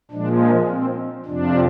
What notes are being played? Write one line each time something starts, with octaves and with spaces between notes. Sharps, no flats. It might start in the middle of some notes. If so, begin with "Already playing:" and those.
A#2 F3 G#3 D4
C4
F2 C3 F3 D4